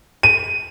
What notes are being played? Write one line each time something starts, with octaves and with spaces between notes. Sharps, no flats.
D#7